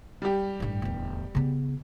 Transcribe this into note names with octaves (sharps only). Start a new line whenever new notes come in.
G3 G4
A1 G2
D1 E2
C#3 B3